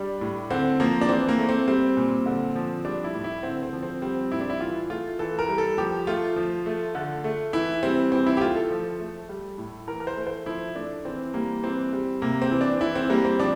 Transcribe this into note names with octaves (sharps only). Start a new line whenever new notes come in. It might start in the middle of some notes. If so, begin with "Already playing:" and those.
Already playing: G3 D4
A2
D3 C4
F3 A#3
D4
E3 C4
A#3
A3
C4
G3 C4
A#2
D3
F3
G3 D4
E4
A2
E4
D3 C4
C4
F3
C4
G3 C4
A2 E4
D4
E4
E3 F4
A3 F4
E3 A4
A#4
G3
A4
F3 G4
A3 F4
F3
A3
D3
A3
E3 E4
G3 C4
E3 C4
E4
G4
A3 F4
A4
F3
A3
G3
A2
E3 A#4
A#4
C5
A3
C5
F3 E4
A3 D4
E3 C4
G3 A#3
E3 C4
G3
C3 A#3
C4
E3
D4
E3 E4
C4
G3 A#3
C4
F3 D4